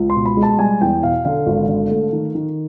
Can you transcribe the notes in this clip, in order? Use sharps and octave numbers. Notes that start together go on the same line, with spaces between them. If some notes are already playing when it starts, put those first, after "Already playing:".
Already playing: C#2
C6
B2
B5
G#3
A5
G3 G#5
E2 G5
B2 F5
D3 F5
G#1
D3
A3
D#3
D#3